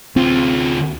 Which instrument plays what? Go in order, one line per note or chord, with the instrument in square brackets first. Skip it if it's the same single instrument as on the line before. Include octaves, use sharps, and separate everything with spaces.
[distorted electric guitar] D2 F4 [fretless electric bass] C4